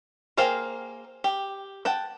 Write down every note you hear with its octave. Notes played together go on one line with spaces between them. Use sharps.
A#3 G#4 C5 F5 G5
G4
F#5 G5 A5